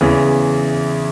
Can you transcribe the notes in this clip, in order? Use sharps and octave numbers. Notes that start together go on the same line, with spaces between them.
E2 C#3 E3